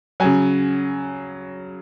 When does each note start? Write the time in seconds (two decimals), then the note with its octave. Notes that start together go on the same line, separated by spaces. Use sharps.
0.20 C#3 F#3 G#5